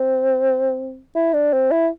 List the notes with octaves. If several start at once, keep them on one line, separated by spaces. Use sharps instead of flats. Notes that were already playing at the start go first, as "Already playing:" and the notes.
Already playing: C4
E4
D4
C4
E4